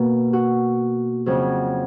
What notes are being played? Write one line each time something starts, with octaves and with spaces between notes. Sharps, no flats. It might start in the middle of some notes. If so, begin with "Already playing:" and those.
Already playing: B2 A#3 F#4
F#4
F2 C#3 F#3